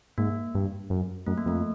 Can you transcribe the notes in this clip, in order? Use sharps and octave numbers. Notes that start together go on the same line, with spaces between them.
G#2 A#3
G2
F#2
F#2 A3
A#3
F2 A3